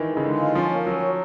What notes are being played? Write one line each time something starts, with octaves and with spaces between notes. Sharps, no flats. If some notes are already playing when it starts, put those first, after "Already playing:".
Already playing: D#3 E3
G#3
C#3
D3 G#3
F4
F3 C#4
A#3
F#3 C#4
F#3